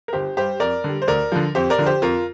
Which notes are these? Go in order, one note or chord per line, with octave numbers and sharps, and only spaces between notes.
A#4
G1 G4 C5
G2 G3 G4 C5
F2 A#4 D5
D3 G3
C5
D2 A#4 D5
D3 F3
F2 G4 C5
A#4 D5
D3 F3
G4 C5
F2 F4 A#4